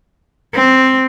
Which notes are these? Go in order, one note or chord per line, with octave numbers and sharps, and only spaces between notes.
C4